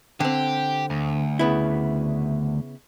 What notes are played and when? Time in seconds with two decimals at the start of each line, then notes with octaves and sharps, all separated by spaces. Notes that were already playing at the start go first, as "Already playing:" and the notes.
0.20 D3 C4 G4
0.90 D2
1.39 C#3 B3 E4